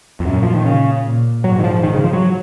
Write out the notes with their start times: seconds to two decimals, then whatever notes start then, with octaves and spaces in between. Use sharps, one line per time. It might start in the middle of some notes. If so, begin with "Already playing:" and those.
0.20 F2
0.26 F#2 A#2
0.43 F3
0.55 D#3
0.65 C#3
1.04 A#2
1.44 G#2 F#3
1.59 D#3
1.64 F3
1.83 D#3
1.94 C#3
2.04 F3
2.13 F#3